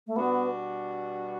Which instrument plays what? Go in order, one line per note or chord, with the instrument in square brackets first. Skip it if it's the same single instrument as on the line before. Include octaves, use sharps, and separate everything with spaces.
[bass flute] A3
[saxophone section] B2 G3 D4 F#4 [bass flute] B3